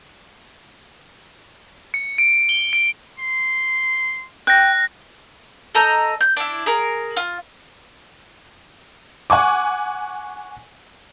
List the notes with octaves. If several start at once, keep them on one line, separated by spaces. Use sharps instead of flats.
C#7
D7
G7
D7
C6
G5 F#6 A#6
A4 D#5 A#5 G6
G6
D4 E4
G#4 A#4
F4
F#5 G#5 C#6 D6